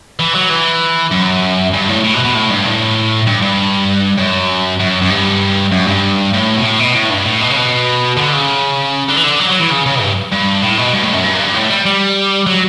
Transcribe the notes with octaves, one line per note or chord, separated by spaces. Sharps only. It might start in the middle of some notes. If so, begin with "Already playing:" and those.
E3
F#3
E3
F#2
G2
A2
A2
B2
B2
A2
G2
A2
G2
G2
F#2
F#2
F#2
G2
F#2
G2
A2
B2
A2
B2
A2
G2
A2
B2
C#3
B2
D3
C#3
D3
E3
D3
F#3
F#3
E3
C#3
C#3
G2
G2
A2
B2
G2
A2
F#2
G2
F#2
G2
A2
A3
G3
G3
F#3